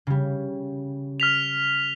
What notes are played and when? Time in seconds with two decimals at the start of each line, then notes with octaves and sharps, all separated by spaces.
0.07 C#3 G3
1.20 F6 B6 F7